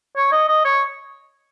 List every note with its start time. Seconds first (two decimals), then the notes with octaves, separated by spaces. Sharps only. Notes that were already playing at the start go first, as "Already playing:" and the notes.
0.17 C#5
0.32 D#5
0.48 D#5
0.65 C#5